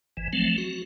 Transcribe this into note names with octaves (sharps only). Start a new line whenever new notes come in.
G#1 E3
F3 F#3 A3 C4
F#4